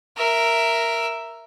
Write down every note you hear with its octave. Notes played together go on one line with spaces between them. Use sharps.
A#4 E5